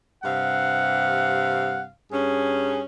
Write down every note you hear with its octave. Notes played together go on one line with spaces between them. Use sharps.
G2 C3 F5 F#5
G2 C#4 G#4